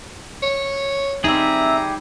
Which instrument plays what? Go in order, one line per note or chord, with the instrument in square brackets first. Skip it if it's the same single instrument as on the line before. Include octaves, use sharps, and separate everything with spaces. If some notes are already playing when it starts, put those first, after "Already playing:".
[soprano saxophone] C#5
[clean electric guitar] G3 G#4 [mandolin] C4 E5 [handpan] D#4 [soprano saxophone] A#5